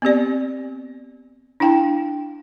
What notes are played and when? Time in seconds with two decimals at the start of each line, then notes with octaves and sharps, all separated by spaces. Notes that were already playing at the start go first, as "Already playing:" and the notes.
0.02 B3 C4 G4 D5
1.60 D4 E4 F5 G5 A5